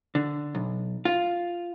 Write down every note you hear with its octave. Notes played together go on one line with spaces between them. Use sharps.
D3
B1
F4